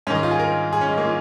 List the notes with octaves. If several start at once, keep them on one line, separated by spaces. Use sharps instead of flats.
G#2 D#3 C#4
D#4
F4
G#4
A#4
G#4
C#4
G#3
A#3
F4